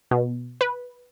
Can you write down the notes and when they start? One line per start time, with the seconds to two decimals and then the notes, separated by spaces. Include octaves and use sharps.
0.11 B2
0.61 B4